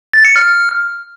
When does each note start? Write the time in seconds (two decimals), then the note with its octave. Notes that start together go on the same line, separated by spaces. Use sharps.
0.13 A6
0.25 C#7
0.36 F6